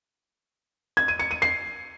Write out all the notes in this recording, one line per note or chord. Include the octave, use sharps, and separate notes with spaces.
G#6
D#7
C#7
D#7
C7